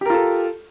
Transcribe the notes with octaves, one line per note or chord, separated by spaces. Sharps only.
F4 G4 A4 A#4